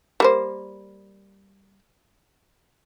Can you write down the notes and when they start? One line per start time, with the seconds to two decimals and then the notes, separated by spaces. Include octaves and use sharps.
0.20 G3 A#3 C5